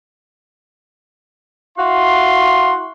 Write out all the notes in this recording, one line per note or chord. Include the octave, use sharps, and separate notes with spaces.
E4 F#4 F5 C6